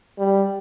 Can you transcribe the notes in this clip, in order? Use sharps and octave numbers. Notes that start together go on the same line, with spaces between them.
G3